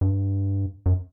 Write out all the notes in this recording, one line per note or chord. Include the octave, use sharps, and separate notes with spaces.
G2
F#2